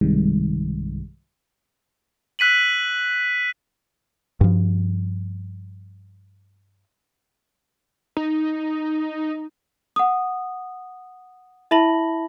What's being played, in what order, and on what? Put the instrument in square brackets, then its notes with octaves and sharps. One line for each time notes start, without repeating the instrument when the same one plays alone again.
[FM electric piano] B1 G2 C3 D#3 G3 G#3
[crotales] E6 F#6 B6 D#7 F#7
[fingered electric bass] G2 F3
[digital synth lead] D#4
[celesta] F#5 D#6
E4 E5 A5 B5 A#6 F#7